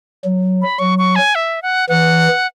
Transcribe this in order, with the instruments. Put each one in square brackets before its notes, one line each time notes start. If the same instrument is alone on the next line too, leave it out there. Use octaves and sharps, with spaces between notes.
[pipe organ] F#3
[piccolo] B5
[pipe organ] F#3 [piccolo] C#6
[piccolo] C#6
G#5
E5
F#5
[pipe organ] E3 [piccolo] F#5